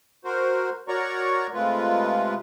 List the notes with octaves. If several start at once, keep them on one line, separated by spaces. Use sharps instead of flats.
F#4 A#4 C5
F#4 A#4 C#5 D5 A#5 C#6
C3 G#3 A3 F4 B4